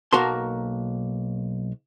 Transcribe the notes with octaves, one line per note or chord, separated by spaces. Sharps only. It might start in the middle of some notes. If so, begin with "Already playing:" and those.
B1 A#3 F#4 A#4 A5 C6